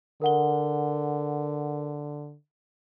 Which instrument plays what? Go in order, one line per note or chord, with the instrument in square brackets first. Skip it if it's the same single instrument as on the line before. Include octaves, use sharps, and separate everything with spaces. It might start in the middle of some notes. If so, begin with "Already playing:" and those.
[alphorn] D3 [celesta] A#4 F#5 G7